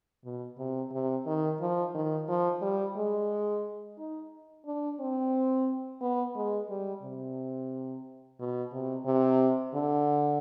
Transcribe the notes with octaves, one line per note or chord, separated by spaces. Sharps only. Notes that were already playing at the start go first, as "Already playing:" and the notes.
B2
C3
C3
D#3
F3
D#3
F3
G3
G#3
D#4
D4
C4
B3
G#3
G3
C3
B2
C3
C3
D3